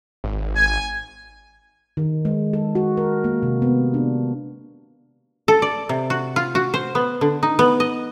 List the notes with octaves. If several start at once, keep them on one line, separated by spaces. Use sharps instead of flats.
G#1
G#5
D#3
G#3
A4
F#4
A#4
A#3
C3
B3
D4
A4
D5
C3
F#4
F4
F#4
C5
B3
D3
D#4
B3
D#5